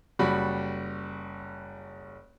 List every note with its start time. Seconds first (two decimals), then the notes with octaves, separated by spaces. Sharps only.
0.19 F#1 G3 F#4 B5